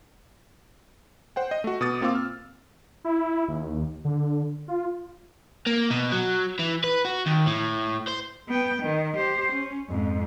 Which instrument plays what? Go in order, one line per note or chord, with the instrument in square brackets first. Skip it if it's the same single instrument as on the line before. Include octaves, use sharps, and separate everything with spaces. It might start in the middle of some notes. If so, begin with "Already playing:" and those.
[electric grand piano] C5 F#5 G5
D#5
A3 F#4
B2 D6 D#6 A6
A#3 C4 F4 F5 D6 E6
F6
[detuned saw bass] E4
D#2
D3
F4
[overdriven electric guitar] A#3
B2
F#3
E3
B4
F#4
D#2
A2
C5
[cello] B3 G5
D#3
G4 C5
C#4
F2 G#2